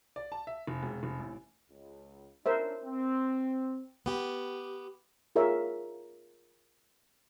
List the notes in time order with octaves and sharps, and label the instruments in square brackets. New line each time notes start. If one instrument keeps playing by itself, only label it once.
[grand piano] D5
A5
E5
F1
E1
F1
A1
[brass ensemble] C#2
[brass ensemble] C#4 D4 [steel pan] A#4 C5 E5
[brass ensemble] C4
[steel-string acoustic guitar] B3 G4
[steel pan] F4 G#4 A#4 C#5 E5